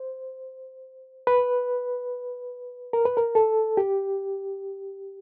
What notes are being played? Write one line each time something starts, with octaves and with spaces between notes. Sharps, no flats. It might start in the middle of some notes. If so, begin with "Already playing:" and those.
Already playing: C5
B4
A#4
B4
A#4
A4
G4